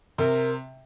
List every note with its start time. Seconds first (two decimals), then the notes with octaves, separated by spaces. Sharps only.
0.18 C3 A#4